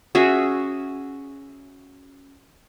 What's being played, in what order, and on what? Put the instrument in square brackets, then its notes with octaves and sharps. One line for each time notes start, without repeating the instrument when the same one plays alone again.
[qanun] C#4 F#4 G#4 E5